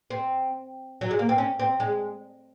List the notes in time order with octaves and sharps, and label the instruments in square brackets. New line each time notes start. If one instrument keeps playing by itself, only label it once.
[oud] C4
F#3
G#3
A#3
C4
C#4
C4
G#3